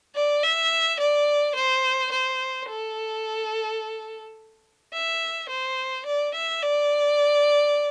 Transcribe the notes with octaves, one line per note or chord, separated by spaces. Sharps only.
D5
E5
D5
C5
C5
A4
E5
C5
D5
E5
D5